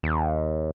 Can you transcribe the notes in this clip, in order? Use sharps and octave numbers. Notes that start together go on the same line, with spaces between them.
D#2